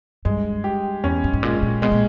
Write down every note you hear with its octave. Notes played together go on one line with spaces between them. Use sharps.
G2 G#3
G4
E2 C#4
G2
G#2
A#2 G#3
A#2
B2 G#3
A#2